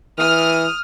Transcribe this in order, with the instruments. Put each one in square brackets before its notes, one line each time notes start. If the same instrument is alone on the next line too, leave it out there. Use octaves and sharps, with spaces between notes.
[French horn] E3 [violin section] D#6 F6